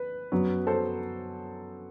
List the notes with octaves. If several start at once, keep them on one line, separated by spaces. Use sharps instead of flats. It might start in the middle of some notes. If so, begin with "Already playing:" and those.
Already playing: B4
F#2 F#3 B3
A4 C5